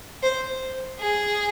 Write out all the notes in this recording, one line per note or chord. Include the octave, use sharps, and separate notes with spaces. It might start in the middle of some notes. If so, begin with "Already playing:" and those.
C5
G#4